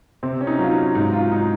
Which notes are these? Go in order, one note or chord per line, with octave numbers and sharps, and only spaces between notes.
C3 C4
C#4
D#4
F#3 F4
D#4
G#2 D#4
F4
D#4